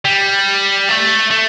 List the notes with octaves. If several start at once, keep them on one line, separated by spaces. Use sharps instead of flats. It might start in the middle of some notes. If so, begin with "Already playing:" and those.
G3
A3
A3